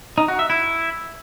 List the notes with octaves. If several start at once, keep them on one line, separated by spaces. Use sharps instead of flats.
D#4
F#4
E5
E4